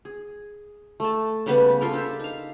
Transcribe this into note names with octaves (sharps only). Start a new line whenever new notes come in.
G#4
A3 A5
C#3 G3 B3
F4 A4 A#4
D4 G4 E5
D#4 F5